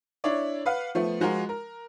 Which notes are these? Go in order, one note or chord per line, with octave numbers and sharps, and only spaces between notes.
D4 E4 C#5 D5
B4 F5 F#5
F3 A3 B3
F3 G#3 F4 F#4 A#4
A#4